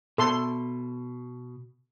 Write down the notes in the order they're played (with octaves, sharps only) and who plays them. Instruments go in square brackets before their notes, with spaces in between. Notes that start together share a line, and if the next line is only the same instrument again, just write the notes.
[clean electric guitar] B2 [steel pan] A4 C6